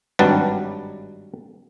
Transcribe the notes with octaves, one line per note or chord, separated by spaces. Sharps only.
G#1 G2 F#3 G3 B4 A5